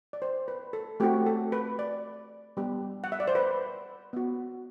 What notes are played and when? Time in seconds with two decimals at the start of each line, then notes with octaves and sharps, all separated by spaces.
0.13 D5
0.22 C5
0.48 B4
0.73 A4
1.00 A3 C4 F#4 G4
1.26 A4
1.52 B4
1.79 D5
2.57 G3 B3 D4 G4
3.04 F#5
3.12 E5
3.20 D5
3.28 C5
3.35 B4
4.13 B3 F#4